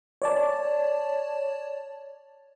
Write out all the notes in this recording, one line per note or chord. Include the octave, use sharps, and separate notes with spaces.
C#5 D5 A5